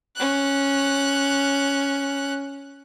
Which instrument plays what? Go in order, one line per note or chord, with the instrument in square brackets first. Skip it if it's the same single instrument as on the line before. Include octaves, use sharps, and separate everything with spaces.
[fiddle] C#4 F#6